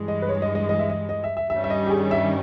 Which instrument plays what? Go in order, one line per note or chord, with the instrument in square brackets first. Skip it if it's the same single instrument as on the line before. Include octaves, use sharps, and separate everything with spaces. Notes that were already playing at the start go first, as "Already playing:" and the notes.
Already playing: [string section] G2 E3 G#3
[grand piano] D#5
B4
C#5
D#5
D#5
D#5
E5
D#5
D#5
E5
E5
[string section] G2 D#3 G3 C#4 [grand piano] E5
[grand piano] E5
D#5
G4
G#4
E5